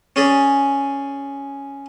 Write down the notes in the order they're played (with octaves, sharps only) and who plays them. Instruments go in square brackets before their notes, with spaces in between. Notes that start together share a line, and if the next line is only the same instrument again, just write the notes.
[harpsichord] C#4 G#4 D5